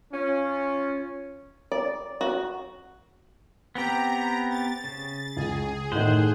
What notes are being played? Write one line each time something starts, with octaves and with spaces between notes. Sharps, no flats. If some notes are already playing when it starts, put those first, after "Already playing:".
C#4 F4
D5
F#4
B3 C4 G4 A#5
A6
C#3
C#2 G#4
A2 D#3 C5 F#5